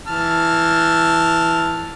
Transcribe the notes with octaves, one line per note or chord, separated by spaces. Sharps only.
E3 A5 F6